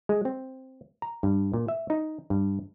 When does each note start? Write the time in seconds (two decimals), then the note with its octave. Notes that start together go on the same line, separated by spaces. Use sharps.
0.09 G#3
0.25 C4
1.02 A#5
1.23 G2
1.54 A#2
1.68 E5
1.90 D#4
2.30 G2